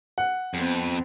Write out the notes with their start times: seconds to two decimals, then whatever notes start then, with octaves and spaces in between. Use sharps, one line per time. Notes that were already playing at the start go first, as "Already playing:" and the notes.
0.18 F#5
0.54 F2 B3 C4